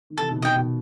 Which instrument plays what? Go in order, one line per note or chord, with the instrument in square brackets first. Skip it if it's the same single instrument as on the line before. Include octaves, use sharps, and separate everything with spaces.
[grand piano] D#3
[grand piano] C3 E3 [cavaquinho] A4
[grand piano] B2 D#3
[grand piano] B2 D#3 [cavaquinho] D#5 G5
[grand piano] B2